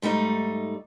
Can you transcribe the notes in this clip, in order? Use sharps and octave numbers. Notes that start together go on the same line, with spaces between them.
G#2 G3 A3 D#4